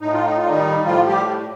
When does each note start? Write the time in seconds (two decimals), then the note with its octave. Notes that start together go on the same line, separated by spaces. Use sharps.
0.01 A2 D#4
0.13 F4
0.25 D#4
0.38 F4
0.44 G3
0.49 D#3 D#4
0.86 A2 F3 F4
1.07 G3 G4